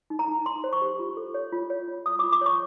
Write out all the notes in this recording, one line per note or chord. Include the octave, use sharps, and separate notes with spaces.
D#4
A#5
D#4
D#4 C6
C5
C#6
G4
F4
A4
C#5
F4
C#5
F4
C#5 D#6
F4 D6
D6
C#5 C#6